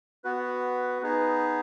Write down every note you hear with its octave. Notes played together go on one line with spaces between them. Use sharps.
B3 F#4 B4
B3 D#4 G#4 B4